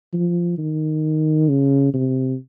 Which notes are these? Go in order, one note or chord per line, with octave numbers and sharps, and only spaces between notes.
F3
D#3
C#3
C3